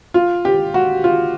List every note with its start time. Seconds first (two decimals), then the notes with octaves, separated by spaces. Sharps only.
0.14 F4
0.45 G4
0.74 F#4
1.04 F4